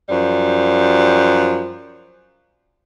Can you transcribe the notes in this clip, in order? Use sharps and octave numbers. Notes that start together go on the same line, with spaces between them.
F#2 F3 G3